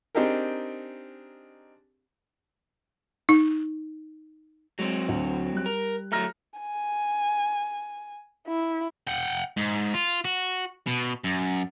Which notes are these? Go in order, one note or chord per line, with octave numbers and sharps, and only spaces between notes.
C4 D4 D#4 G4 G#4 A#4
D#4
F#3 G#3 C4
D2
G3 F#6
A#4
F#3 A3 A#5 F6 A#6
G#5
E4
F#5 G5
G#2
F4
F#4
B2
F#2